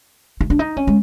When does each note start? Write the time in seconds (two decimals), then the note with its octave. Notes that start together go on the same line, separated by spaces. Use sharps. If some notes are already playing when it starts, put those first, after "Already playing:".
0.41 E4
0.50 D4
0.59 D#4
0.77 C#4
0.87 G#3